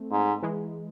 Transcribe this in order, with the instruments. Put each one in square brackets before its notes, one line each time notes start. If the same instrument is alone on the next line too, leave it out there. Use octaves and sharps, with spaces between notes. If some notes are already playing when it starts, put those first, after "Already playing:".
Already playing: [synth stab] A3 C4
[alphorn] G#2
[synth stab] E3 G#3